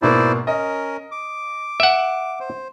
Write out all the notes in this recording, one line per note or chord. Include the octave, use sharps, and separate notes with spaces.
G#2 B2 A#3 E4 C5 D5
C#4 A#4 D#5
D6
E5 F#5 D7
C5